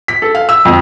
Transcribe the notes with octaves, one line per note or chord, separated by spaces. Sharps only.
B6
A4
F5
E6
F2